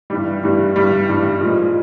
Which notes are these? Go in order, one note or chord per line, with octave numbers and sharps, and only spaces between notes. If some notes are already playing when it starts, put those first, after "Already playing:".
G2 E3 G3
G2 E3 G3
G2 E3 G3
G2 E3 G3
A#2 F3 G#3